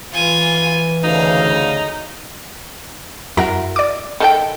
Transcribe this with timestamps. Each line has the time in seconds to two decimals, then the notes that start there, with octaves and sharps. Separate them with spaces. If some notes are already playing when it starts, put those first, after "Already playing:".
0.13 E3 F4 G#5
1.04 D2 C#3 D#4 F5
3.37 F#2 E4 F#4 A#4 A#5 A#6
3.76 D5 D6
4.20 D#3 A4 G5